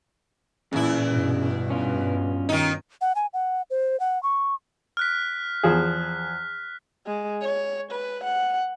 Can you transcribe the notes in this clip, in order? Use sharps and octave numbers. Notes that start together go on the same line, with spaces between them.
E2 A#2 C#3 E4
G2 B2
C#4 F4
D#3 D#4
F#5
G#5
F#5
C5
F#5
C#6
F6 F#6 B6
E2 F3 G#4
G#3
C#5
B4
F#5